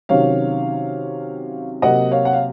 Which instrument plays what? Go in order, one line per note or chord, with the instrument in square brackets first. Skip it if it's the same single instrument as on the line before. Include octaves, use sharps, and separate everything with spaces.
[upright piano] C3 D#3 F#3 C#4 C#5 F5
C3 F#3 A#3 D#5 F#5
C#5 F5
F#5
F5